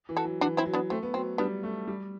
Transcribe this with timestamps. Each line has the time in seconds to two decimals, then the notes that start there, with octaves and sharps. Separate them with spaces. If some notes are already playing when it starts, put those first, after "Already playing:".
0.09 E3
0.17 F#4 A4
0.25 F#3
0.41 E3 D4 F#4
0.57 C4 E4
0.65 F#3
0.73 B3 D4
0.90 A3 C4
1.02 B3
1.14 F#3 C4
1.38 G3 B3 D4
1.63 A3
1.87 G3